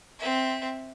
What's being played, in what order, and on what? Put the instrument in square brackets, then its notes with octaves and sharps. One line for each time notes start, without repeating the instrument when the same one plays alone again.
[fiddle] C4 E5